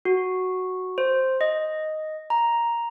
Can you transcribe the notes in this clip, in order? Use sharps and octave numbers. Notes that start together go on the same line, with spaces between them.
F#4
C5
D#5
A#5